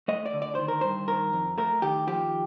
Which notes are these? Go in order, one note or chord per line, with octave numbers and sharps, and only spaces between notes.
A3 D#5
D5
D3
D5
D#3 C5
A#4
G2 C5
D#3 A#4
F2
A3 A#4
D#3 G4
F3 G4